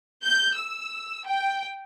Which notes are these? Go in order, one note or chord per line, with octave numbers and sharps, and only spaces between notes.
G6
E6
G5